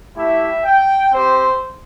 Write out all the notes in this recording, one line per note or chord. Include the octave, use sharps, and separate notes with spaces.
A3 E4 G4 E5
G5
C4 G4 C5